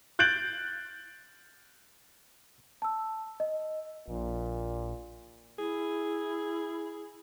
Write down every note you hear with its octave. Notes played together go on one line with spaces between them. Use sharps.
F#6 G6 A6 D7 F#7
A5 E6
D#5
A#1 A#2
E4 G#4